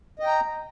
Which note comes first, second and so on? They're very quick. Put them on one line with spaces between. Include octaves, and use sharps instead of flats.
D#5 G5 A#5